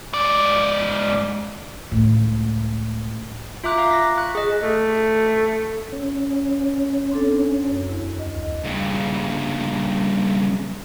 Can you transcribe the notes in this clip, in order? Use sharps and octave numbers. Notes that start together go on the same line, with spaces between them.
G#2 D5
C#2 A2
F4 E5 A#5 D6 F#6
F5 A#5 D6
A#6 B6
C#6 F#6
G#4 D#5
A3
C#4
C4 D4 A4
F#2
E2 E4
D2 D#5
G2 C#3